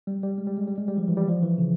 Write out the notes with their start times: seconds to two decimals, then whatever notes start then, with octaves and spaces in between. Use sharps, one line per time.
0.07 G3
0.23 G3
0.38 G#3
0.47 G3
0.57 G#3
0.68 G3
0.78 G#3
0.88 G3
0.97 F3
1.08 E3
1.17 G3
1.28 F3
1.43 E3
1.58 C#3